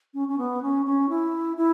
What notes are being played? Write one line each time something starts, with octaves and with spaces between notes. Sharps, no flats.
C#4
C#4
B3
C#4
C#4
E4
E4